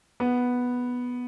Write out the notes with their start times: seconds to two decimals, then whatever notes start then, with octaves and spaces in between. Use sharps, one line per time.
0.20 B3